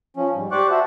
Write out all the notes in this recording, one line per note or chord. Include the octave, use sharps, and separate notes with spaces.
F3 C#4
G#2 G3
G4 C5 D5 C#6 D6 F#6
F#4 C5 E5 F#5 A5